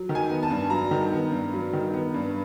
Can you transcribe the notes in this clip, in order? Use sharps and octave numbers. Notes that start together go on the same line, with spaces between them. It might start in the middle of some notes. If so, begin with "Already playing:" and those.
Already playing: F#3
D#3
G#5
B3
A5
G2
F#3 A#5
D#3
B3
G2
F#3
D#3
B3
G2